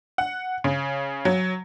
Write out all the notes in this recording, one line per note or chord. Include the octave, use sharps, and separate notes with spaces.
F#5
C#3
F#3